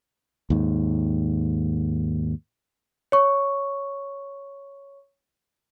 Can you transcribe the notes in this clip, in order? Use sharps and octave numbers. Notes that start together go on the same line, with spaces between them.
D#2 G#2
C#5 C#6